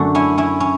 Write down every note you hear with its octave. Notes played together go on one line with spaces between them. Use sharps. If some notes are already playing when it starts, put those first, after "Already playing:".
Already playing: F#2 D3 A3 F#4
C#4 E4
C#4 E4
C#4